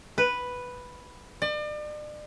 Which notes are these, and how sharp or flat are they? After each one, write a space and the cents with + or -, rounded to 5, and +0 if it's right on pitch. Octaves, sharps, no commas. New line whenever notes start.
B4 +0
D5 +40